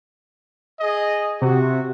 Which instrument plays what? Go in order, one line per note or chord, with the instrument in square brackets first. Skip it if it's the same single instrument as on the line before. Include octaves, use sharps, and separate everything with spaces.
[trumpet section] G#4 D#5
[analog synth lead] C3 [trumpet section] F#4